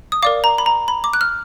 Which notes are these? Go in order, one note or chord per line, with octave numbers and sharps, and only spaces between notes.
D#6
A#4 D5 F5 D6
A#5
B5
A#5
B5
D6
F#6
F6